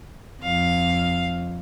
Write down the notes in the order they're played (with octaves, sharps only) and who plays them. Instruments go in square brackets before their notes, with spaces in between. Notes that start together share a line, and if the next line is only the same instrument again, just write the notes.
[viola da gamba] F2 [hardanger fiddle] F5